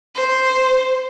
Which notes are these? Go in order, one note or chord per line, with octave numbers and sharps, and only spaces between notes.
C5